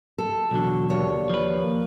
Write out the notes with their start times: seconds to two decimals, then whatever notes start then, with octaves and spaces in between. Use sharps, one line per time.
0.18 A4
0.51 B1 E2 D3 F#4
0.90 D#2 C#5 D5
1.30 F3 B4
1.57 A#3